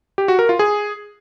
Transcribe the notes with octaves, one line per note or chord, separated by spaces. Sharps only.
G4
F#4
A#4
F4
G#4